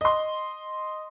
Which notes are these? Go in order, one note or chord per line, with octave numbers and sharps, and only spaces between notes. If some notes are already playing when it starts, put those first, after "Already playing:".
D#5 C6